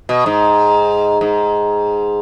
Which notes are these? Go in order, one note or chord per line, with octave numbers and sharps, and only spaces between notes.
B2
G#2
G#2